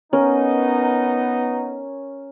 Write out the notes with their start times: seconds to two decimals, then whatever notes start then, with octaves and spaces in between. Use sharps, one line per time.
0.13 B3 C#4 D#4 A#4